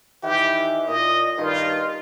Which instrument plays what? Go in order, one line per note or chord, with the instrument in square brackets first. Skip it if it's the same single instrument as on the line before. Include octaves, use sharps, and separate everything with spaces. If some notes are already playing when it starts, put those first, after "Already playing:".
[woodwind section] D#3 E3 [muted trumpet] G4
[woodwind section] A#2 [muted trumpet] D#5
[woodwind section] G2 D#3 [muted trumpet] F4